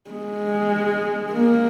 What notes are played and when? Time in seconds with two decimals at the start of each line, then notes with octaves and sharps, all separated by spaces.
0.10 G#3
1.32 A#3